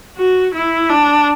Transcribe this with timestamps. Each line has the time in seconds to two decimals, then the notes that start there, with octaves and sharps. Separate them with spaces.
0.18 F#4
0.54 E4
0.89 D4